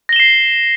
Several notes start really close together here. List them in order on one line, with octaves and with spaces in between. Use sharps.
A#6 G7 E7 C7